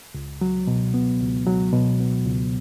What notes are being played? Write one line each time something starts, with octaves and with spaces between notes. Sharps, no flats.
C#2
F#3
B2
B3
C#2
F#3
B2
B3
C#2